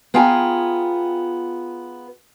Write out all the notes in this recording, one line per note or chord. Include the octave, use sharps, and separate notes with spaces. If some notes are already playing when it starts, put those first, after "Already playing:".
B3 F4 G#4 G5 G#5 A#5